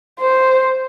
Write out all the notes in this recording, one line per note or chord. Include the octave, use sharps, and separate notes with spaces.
C5